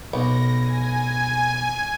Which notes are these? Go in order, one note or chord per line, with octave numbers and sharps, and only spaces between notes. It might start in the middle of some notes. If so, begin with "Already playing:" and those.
B1 A#6
G#5